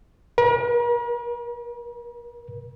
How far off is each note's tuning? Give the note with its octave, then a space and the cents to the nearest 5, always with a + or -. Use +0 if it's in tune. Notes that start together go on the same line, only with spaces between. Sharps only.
A#4 +45